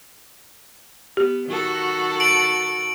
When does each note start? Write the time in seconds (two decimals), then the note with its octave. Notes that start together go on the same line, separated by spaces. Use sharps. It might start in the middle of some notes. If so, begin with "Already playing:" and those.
1.17 B3 G4
1.48 D#3 F#4 A4
2.20 D7 F#7